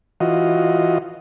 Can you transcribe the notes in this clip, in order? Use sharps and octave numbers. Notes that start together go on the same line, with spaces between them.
E3 F4 F#4 D#5